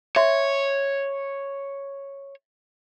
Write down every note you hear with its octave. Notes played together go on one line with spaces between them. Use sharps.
C#5 E5 C6